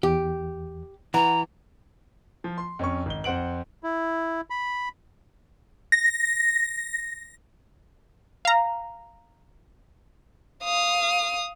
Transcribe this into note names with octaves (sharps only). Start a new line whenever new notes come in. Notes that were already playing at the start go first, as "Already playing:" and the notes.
E2 G4
E3 F#5 A#5
F3
C6
F2 C#4 C#6
G#1 G7
F2 C5 F#5 D7 F#7
E4
B5
A#6
F5 A#5
F5 D#6